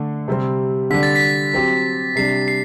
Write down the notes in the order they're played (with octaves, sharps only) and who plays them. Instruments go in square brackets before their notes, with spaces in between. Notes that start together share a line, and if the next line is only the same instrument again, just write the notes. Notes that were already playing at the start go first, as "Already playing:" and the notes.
Already playing: [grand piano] D3 A3 D4
C3 G3 C4
[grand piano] D3 G3 D4 [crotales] B6
[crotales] A6
B6
[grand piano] F#3 C4 G4
[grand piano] C3 G3 D4 [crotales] C7
[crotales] C7